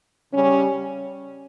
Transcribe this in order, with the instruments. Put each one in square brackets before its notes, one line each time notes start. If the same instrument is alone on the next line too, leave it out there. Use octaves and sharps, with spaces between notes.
[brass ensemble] C#3 G3 C#4